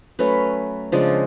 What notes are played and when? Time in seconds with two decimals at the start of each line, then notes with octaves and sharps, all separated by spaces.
0.19 F#3 A3 C#4 B4
0.92 C#3 F3 G#3 D4